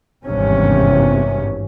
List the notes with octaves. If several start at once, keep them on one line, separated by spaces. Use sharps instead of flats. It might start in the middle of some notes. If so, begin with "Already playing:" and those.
G#1 E2 G2 C3 E3 C#4